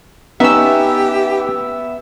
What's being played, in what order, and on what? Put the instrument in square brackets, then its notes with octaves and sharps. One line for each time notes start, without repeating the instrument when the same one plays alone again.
[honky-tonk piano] B3 [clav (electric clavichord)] C#4 D#4 [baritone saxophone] G4 [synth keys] E5 E6